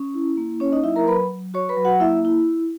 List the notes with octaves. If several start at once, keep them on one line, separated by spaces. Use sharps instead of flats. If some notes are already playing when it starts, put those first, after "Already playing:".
Already playing: C#4
E4
A#3
A#3 C#4 C#5
D#4 D#5
F#3 E4 E5
A#4 A#5
F#3 B4 B5
F#3
F#4 C#5 C#6
B4 B5
F#3
F#4 F#5
A#3 E4 E5
E4